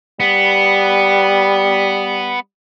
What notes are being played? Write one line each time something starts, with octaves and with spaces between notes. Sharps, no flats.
G3 B3